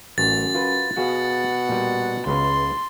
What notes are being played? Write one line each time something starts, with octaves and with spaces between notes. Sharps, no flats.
A1 F#2 A6
F4 F#4 B4
B2 F#4 G#4 F5 F#5
A#2 G3
C#2 C#3 B4 C6